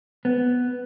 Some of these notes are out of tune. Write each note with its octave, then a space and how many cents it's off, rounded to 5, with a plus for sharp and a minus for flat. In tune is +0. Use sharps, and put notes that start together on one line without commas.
B3 +5